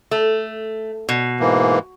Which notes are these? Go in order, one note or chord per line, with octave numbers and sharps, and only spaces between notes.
A3
B2
G#2 E3 A#3